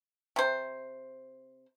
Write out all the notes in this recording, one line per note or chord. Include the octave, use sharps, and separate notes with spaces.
C3 C5